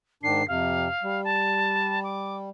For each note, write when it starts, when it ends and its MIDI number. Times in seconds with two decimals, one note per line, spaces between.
0.23 0.43 44
0.23 0.43 51
0.23 0.43 62
0.23 0.46 96
0.48 0.88 41
0.48 0.88 48
0.48 1.24 77
1.03 2.50 55
1.24 2.00 81
2.04 2.37 86